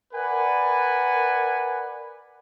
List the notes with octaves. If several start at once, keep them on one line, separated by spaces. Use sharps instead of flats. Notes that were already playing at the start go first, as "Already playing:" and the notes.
A#4 B4 D5 F#5 G#5